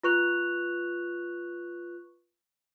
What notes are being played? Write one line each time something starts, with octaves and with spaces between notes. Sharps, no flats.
F4 B4 C#6 F#6 F7